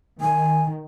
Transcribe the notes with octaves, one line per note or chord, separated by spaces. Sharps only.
D#3 G#5